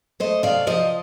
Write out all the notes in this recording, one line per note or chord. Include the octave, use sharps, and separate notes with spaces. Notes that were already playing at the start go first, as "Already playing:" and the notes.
A3 C5 D#5
C3 D5 F5
F3 C5 D#5